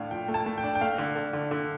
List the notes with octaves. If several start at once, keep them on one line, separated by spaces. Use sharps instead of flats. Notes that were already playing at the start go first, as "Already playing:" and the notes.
Already playing: A2 A3 D4 F5
F3 G5
A3
A5
A3
G5
D4
G5
A3 F5
D3
D3
D3
D3